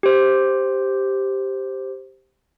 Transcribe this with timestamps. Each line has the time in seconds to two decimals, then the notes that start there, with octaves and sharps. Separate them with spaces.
0.03 G4 C5